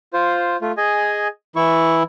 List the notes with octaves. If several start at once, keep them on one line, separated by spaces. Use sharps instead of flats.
F4 C5
A3 F4
G#4 D#5 G#5
E3 E4 C#6